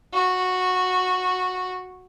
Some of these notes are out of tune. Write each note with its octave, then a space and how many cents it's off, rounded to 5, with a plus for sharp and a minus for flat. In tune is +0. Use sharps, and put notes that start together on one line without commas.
F#4 -10